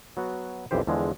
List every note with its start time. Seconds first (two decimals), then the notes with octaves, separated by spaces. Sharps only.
0.17 F#3 B3 F#4
0.71 B1 F2 E3 G4 C5
0.87 E2 D3 F3 G#3